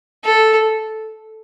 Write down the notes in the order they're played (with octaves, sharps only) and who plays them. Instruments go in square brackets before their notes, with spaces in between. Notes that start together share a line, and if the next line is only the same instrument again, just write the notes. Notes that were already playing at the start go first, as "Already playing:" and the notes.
[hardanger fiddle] A4